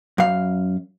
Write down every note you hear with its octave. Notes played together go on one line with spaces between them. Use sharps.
F#2 F5